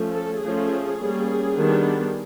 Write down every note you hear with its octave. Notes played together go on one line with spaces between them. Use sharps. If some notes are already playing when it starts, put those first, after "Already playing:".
Already playing: F3 A3 C#4
A4
F3 A3 C#4 G#4
G3 A#3 C#4
D#3 G3 B3 D4